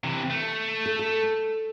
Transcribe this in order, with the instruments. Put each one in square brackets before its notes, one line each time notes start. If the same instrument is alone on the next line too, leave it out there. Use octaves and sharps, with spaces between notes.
[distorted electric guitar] C3 E3
A3
[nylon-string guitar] A4
A4